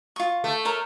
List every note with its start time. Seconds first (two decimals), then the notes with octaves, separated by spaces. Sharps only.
0.16 F4 C#6
0.44 A3
0.65 A#4 C#5 E5